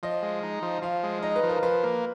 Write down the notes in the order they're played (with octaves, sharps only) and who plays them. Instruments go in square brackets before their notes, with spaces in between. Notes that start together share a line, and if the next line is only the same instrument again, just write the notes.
[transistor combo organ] F3 [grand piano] D#5
[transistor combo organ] G#3
D#4
F3
[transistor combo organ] F3 [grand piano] F5
[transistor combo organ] G#3
[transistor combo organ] D#4 [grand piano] D#5
[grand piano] B4
[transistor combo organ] F3
[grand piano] A#4
[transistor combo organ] F3 [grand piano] B4
[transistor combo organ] A#3